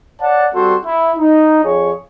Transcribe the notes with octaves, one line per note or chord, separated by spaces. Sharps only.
C#5 D5 F#5 A5
G3 C4 F#4 A4 C5
E4
D#4
F2 G#4 C#5